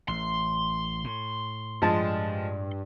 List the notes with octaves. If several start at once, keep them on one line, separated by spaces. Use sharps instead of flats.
A1 C6
A2
G2 F3 G#3 A5